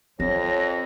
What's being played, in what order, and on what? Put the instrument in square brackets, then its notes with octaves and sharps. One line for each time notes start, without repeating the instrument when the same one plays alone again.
[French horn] F2 [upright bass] C4 [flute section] C#5 [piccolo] A#6